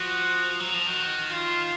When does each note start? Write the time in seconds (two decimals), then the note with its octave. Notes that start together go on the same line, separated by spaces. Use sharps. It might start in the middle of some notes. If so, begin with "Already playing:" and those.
Already playing: F3 F#4
0.60 F#3
0.74 F3
0.87 D#3 F#4
1.30 F4